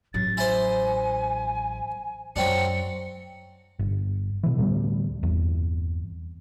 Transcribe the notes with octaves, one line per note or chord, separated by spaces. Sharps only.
A1 F#3 A6
E4 C5 G#5
F#2 F#3 C4 D4 C#7
G1
B2 E3
D2 A2 G3 B3
G1 E2